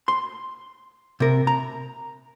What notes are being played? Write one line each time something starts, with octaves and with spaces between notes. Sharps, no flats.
C6
C3 A#4
A#5